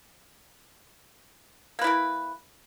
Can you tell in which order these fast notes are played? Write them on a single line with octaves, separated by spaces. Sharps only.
A#3 B4 E4 A#4